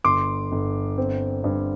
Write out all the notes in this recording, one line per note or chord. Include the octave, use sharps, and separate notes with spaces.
G1 C6 D6
G1
C4
G2